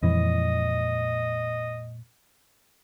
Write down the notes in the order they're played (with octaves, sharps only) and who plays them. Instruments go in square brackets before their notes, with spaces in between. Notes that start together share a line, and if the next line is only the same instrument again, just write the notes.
[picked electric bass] F2 E3 [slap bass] A#2 G#3 [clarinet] D#5